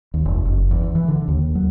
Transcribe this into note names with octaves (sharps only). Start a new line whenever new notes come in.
D#2
F1
F#1
E2
E3
D3
D#2
F#3